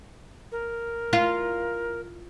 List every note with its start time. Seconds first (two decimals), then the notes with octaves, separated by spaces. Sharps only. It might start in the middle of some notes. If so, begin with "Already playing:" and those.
0.52 A#4
1.13 F4